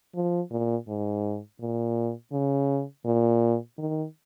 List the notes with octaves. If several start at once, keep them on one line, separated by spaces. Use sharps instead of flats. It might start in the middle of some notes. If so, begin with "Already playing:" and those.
F3
A#2
G#2
A#2
C#3
A#2
D#3